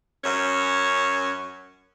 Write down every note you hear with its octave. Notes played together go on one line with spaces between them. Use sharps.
F#2 C#4